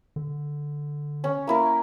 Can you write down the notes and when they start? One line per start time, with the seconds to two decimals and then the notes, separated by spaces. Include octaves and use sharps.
0.16 D3
1.24 C#4
1.47 A#3 E4 A#4